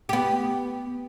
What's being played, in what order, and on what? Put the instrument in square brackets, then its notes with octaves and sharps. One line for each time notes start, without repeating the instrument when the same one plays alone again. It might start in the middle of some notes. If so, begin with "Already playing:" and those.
[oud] B3 G4